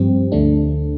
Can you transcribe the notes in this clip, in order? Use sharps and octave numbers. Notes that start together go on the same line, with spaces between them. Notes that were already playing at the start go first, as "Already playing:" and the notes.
Already playing: G2 F3 C4 G4
D2 D3 A3 D4